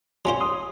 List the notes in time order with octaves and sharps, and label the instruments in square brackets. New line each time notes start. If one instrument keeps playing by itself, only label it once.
[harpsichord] F#3 C#4 F4 C5 [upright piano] G#5 C6
[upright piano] C6 D#6